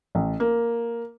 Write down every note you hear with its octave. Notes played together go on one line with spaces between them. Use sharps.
A1
A#3